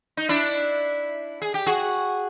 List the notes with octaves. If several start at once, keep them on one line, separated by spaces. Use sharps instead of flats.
D#4
D4 E4
G#4
G4
F#4 G#4